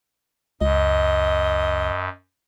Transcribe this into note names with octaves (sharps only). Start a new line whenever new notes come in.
C#2 F#2 D#5